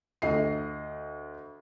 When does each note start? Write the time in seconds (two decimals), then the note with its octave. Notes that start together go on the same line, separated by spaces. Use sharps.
0.22 D2 D#5 C7